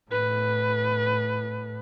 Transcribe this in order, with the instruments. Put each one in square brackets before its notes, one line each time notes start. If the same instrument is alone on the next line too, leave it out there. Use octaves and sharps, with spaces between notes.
[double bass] A2 [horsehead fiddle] B4